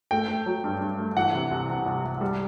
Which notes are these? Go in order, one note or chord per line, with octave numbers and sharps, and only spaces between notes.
A3 G5
A3
F#3
G2
G2
A3
E3 F#5
C3
C2
C3
C2
C2
G3